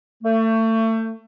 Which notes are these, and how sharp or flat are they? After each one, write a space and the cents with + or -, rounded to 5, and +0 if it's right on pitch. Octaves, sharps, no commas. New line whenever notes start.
A3 +30